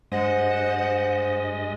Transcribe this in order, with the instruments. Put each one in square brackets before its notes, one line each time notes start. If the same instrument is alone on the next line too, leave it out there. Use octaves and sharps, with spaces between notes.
[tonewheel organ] G2 D#5 [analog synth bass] G#3 [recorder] C5 [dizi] F#5